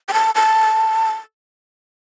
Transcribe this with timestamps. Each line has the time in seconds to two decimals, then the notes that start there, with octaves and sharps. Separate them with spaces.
0.09 G5
0.13 A5
0.35 A5